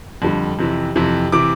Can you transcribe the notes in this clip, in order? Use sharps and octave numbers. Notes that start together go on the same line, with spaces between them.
F2 D3 G3
F2 C3 E3
F2 C3 E3
C3 E3 D6